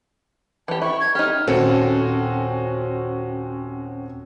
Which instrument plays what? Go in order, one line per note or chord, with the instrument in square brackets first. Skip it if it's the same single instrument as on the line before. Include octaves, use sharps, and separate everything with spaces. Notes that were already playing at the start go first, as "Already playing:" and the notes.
[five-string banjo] E3 G4 [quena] A5
[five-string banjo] E4 [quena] C#6
[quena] G#6
[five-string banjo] D#4 G4 [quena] F6
[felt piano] D#1 C#7 [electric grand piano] C4 C#4 F#4 [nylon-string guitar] A4